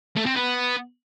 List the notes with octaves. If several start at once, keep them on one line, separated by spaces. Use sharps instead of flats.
A3
C4
B3